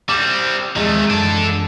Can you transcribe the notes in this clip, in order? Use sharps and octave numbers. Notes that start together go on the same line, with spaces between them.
G3 C4 D6 E7
D#2 D#3 F3 G#3 A3 C4
F#2 E3 D4 A4